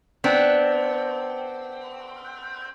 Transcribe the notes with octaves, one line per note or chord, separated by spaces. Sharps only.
B3 C4 D4